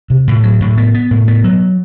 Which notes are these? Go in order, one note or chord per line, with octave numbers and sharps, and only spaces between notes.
C3
A2
F#3
A2
B3
B3
A2
B3
F#3